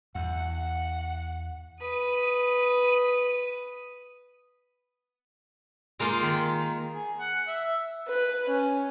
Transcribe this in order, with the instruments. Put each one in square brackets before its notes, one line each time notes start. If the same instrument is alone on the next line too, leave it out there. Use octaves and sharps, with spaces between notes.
[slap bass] E2 [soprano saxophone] F#5
[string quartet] B4 D#6
[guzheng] G#3 A#3 D#4 F4
D#3
[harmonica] G#4
F#5
E5
[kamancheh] B4
C#4